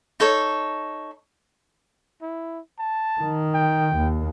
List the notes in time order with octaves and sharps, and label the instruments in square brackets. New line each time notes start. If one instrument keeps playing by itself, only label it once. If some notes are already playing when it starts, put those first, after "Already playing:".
[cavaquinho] D#4 A4 C#5
[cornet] E4
A5
[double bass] D#3
[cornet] G5
[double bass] D#2